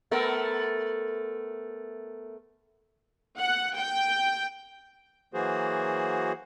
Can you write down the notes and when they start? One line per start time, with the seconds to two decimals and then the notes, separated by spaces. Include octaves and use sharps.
0.11 A3 B3 A#4
3.38 F#5
3.76 G5
5.34 E3 F#3 A#3 F#4 G#4 C5